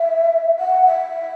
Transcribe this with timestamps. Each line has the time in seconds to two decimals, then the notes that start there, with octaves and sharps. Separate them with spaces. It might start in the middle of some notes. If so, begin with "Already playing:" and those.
Already playing: E5
0.59 F#5
0.86 E5